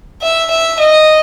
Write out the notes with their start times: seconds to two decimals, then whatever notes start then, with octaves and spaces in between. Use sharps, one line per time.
0.22 E5
0.51 E5
0.79 D#5